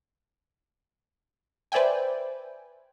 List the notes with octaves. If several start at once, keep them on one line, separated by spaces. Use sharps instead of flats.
B4 C5 D5 E5 G5 G#5